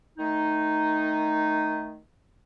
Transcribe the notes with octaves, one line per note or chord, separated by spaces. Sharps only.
D#3 A3 D#4